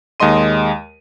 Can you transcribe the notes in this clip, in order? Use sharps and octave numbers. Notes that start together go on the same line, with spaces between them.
D#2 G#3 D#5 C6 D#7